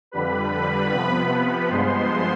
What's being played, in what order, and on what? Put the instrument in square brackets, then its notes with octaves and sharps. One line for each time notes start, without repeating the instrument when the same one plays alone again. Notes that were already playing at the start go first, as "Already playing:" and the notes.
[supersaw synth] F2 D3 G3 B4 B5
C3 F3 B3
G2 F3 G#3 B3 C5 C6